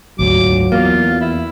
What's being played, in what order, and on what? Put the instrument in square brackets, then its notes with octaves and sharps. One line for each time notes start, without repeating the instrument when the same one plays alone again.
[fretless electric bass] G#1 D2 A#2 [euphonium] F#3 [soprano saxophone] D6
[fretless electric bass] E2 [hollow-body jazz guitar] A#3 [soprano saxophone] F4
[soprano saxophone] E4